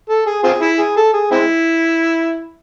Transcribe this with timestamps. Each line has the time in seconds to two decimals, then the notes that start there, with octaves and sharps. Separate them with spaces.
0.09 A4
0.26 G#4
0.44 C4 F4 G#4
0.61 E4
0.79 G#4
0.97 A4
1.13 G#4
1.31 G#3 C4 E4